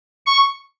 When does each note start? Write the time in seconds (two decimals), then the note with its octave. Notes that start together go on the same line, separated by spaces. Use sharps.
0.26 C#6